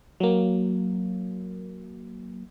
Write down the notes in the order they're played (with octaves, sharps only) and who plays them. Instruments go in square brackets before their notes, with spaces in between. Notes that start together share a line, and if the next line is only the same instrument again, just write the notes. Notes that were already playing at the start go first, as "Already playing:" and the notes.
[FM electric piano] F#3 A#3